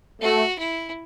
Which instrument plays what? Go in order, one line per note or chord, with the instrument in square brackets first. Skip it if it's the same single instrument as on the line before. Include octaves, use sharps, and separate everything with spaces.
[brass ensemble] A3 [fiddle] F#4
[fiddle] E4